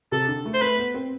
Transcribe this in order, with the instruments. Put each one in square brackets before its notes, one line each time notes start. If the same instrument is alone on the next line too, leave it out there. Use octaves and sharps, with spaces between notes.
[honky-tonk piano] C3 [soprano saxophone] A4
[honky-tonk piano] D3
A3
[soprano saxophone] C5
[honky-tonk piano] A3 [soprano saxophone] B4
[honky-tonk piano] B3
C4